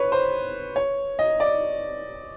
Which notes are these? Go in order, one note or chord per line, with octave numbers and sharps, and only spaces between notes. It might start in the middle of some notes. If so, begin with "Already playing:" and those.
Already playing: B4 C#5
C5
C#5
D#5
D5